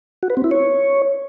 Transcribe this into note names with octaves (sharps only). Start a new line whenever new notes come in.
F#4
B4
C4
E4
C#5